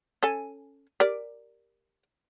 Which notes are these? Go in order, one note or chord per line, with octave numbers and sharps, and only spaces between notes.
C#4 A4 G#5
G4 A#4 D5